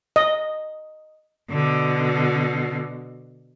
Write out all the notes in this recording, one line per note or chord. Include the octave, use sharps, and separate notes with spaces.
D#5
B2 D3